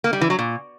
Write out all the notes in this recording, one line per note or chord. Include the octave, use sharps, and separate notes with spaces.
A#3
G3
E3
F#3
A#2